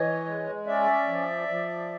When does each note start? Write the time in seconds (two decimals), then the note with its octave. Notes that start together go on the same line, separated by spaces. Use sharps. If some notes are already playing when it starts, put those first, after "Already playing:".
Already playing: E3 C#5 D#5
0.26 G#3
0.67 C#4 D5 E5
1.08 F3
1.48 F3